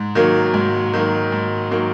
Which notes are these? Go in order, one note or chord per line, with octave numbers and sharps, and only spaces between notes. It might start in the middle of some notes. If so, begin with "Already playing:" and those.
Already playing: G#2
D#3 F#3 A#3
G#2
D#3 F#3 A#3
G#2
D#3 F#3 A#3